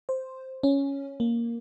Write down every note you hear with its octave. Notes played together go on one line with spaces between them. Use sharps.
C5
C#4
A#3